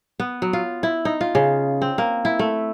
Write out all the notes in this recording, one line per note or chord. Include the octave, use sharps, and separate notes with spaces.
B3
F#3
F4
E4
D#4
F4
C#3
C4
A#3
E4
A3